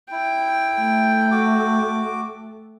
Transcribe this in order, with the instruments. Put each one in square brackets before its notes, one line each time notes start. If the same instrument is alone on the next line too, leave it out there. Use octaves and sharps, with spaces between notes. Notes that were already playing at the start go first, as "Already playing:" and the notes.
[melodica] E4 [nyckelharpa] G5
[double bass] A3
[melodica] F#4 D6